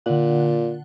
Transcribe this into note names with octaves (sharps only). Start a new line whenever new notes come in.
A#2 D3 F#5